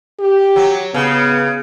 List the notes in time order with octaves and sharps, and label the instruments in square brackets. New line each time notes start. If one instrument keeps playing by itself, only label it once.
[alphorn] G4
[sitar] F#3
[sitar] C#3 [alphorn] B3